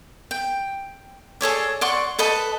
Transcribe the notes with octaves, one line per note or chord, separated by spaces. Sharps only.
G5
G#4 A4 C#5 D5
D5 F#5 C6 C#6
A4 B4 D#5 A5